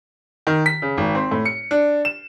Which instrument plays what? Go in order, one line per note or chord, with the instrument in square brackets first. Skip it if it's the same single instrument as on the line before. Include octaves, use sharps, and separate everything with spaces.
[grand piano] D#3
B6
C#3
G#1
C4
A2
C#7
D4
E7